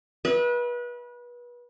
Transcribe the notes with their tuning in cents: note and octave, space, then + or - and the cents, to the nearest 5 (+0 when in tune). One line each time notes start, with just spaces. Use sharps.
B4 -30 E5 -35